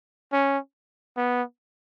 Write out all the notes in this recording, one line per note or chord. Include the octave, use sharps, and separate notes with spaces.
C#4
B3